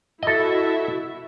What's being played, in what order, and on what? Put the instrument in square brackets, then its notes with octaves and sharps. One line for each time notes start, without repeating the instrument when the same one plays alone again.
[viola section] E4 F#4 E5 [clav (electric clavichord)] A4 D#5